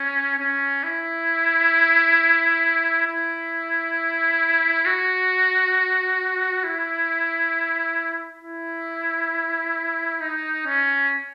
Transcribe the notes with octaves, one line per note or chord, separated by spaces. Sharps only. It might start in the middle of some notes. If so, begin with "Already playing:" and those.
Already playing: C#4
C#4
E4
E4
F#4
E4
E4
D#4
C#4